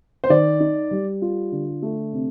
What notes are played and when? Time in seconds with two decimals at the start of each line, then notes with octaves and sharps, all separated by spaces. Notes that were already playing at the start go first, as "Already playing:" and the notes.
0.24 C5
0.30 D#3 D5
0.60 D#4
0.91 G3
1.22 F4
1.52 D3
1.82 A3
2.13 C3